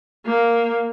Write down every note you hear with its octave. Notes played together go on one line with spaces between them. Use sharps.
A#3